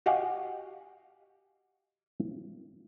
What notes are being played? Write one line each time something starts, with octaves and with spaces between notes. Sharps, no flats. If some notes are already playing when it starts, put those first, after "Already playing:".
F#4 G4 D#5 F5 F#5 G#5